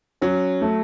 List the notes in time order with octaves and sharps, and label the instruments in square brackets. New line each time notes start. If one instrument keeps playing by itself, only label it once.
[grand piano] F#3 [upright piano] C#4
[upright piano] A3